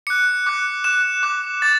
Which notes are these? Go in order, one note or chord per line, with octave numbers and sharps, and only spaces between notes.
D6 F#6 C#7
D6 F#6
D6 F#6 E7
D6 F#6
D6 G6 A6